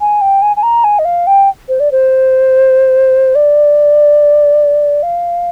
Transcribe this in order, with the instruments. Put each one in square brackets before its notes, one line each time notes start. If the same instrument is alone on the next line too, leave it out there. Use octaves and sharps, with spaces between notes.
[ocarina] G#5
G5
G#5
G#5
A#5
G#5
D#5
F5
G5
C5
D5
C5
D5
F5